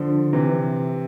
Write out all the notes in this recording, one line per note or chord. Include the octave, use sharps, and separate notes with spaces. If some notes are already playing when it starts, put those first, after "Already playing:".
Already playing: D3 F3
C3 E3